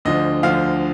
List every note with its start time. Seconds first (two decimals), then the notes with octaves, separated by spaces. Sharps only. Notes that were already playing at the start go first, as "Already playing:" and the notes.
0.05 D2 D3 F3 D#5
0.43 D2 D3 F3 F5